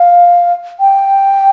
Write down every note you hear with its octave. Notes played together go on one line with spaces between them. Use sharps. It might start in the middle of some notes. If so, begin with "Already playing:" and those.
Already playing: F5
G5